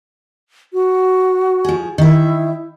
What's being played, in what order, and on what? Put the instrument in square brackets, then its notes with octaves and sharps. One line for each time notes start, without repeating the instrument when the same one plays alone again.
[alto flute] F#4
[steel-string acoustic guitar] F3 G#4
[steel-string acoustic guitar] D#3 E5 [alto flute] E4